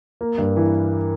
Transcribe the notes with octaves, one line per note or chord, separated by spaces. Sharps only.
A#3
G2
E3